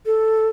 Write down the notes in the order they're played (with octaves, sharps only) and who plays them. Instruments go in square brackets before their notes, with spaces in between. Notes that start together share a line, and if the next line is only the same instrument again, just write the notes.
[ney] A4